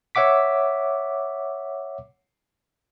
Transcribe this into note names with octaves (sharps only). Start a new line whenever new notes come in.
C#5 E5 F#5 D6 B6